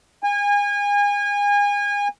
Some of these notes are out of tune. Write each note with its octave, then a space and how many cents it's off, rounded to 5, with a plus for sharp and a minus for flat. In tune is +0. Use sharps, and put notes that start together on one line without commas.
G#5 -30